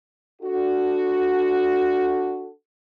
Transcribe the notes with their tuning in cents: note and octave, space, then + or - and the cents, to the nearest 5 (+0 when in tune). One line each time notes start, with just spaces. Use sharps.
D4 +0 F#4 +0 A4 +0